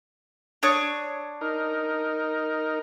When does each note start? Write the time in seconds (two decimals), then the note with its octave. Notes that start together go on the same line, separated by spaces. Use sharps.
0.63 D4 C#5 D#6
1.41 D#4 A#4